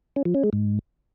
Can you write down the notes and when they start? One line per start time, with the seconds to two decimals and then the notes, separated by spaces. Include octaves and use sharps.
0.16 C#4
0.25 F3
0.34 C#4
0.44 G#3
0.53 G#2